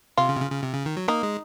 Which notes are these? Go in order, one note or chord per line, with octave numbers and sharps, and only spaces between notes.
C3 F4
C#3
C3
C#3
C#3
C3
C#3
D#3
F#3
A#3 D#4
G#3